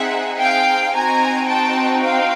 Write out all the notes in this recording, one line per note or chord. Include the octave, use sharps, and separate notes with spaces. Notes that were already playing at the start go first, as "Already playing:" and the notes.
Already playing: C4 D#4 G#4 E5 F#5
F5 G5
C4 D#4 F#4 G#5 A#5
G5 A5
F5 G5